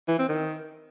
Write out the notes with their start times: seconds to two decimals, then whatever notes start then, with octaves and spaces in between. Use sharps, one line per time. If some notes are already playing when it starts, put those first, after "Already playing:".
0.08 E3
0.19 C4
0.29 D#3